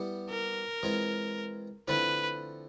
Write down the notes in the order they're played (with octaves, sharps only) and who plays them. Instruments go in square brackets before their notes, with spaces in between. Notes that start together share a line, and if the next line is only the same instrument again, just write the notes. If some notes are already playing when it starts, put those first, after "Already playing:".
Already playing: [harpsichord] G3 B3 E4 G4
[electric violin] A#4
[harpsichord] E3 G#3 C4 F4
[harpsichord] D3 F3 A3 C4 E4 [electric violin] B4